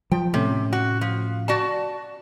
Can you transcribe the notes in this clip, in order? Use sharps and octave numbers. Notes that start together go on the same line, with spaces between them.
F3 G5
A2 C3 A3 C#4
F#4
F3
F#4 D5 A5